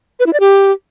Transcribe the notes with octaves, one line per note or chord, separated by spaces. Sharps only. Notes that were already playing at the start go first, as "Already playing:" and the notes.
B4
E4
D5
G4